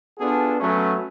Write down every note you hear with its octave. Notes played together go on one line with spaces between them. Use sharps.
B3 D4 F4 F#4 G#4 A4
F#3 A3 B3 C#4